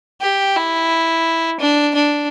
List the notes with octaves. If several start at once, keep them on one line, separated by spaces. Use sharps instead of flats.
G4
E4
D4
D4